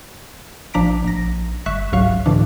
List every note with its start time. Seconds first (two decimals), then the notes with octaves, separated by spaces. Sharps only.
0.74 A#1 F3 D4 A#5 B6 D7
1.04 A#1 A#6
1.66 G1 E5 C#6 F#6 B6
1.93 C#2 G#2 F#3 F5 C#6 F#6
2.26 G#2 B2 D3 E3 D4